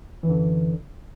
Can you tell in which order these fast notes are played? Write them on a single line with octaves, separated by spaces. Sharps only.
E3 F#2 D3